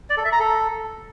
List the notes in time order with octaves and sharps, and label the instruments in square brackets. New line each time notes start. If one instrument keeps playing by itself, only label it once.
[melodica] D5
A4
E5
A#5
A4